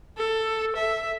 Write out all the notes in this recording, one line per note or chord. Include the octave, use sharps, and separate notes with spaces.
A4
E5